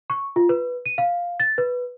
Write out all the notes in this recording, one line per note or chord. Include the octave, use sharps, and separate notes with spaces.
C#6
F4
B4
D#7
F5
A6
B4